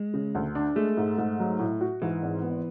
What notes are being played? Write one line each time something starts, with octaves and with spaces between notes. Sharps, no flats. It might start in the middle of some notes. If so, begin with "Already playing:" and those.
Already playing: G#3
C#3
D2
D4
G#3 A3
G#2
G#2
F#3
A2
F#4
G#2 E3
G#1
B3